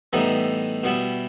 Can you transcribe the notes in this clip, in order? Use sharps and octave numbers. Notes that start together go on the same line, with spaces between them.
A2 E3 G3 B3 D#4
B2 G3 B3 E4